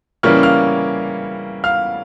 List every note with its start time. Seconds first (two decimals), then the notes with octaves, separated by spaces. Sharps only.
0.23 C#3 E3 G3 A#3 C#4 F6
0.43 F5 F6
1.64 F5 F6